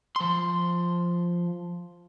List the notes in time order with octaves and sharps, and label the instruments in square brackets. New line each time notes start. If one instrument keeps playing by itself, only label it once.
[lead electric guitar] F3 C6